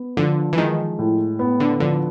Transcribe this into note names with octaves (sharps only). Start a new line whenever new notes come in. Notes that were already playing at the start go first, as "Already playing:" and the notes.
Already playing: B3
D3 F3
E3
D#3 G#3
A2
B3
D3
D3 F3